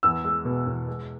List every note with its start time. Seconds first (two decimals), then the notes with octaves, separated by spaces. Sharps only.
0.03 E2 E6
0.24 G#3
0.45 B2
0.67 E2
0.87 G#3